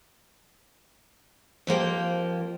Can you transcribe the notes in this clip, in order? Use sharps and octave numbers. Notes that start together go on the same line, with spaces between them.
F2 F3 A#3 G4